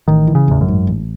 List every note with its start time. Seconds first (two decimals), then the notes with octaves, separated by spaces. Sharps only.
0.08 A1 D#3
0.27 E3
0.35 C#3
0.48 A1 E2
0.61 F#2
0.68 G#2
0.87 A1